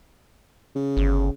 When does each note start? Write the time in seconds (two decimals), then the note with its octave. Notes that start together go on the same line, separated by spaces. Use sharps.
0.75 C#3
0.97 G1